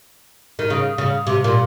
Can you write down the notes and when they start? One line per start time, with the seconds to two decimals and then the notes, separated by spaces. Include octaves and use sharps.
0.59 D#3
0.70 C#3
0.98 C#3
1.27 C3
1.44 A#2